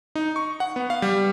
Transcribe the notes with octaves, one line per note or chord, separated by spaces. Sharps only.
D#4
C#6
F#5
B3
F5
G3